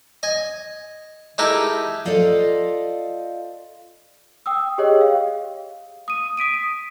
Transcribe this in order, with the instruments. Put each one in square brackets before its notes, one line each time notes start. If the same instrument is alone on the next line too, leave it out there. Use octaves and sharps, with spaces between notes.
[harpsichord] D#5 G#5
G#3 D#4 E4 G4 A4 A#4
[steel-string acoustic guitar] F4 A4 C5 D5 D#5 F5
[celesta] G5 D#6 E6
G4 G#4 C#5 D#5 G5
F5
D#6 D#7
D#6 B6 D7 D#7